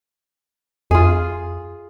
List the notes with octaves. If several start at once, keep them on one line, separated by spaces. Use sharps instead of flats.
F2 F4 G#4